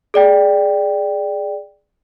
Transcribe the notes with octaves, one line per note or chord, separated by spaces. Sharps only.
G#4 D5 G5